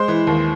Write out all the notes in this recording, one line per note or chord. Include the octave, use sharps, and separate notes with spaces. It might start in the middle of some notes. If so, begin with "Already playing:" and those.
Already playing: G#3 C5 C6
E3
D#2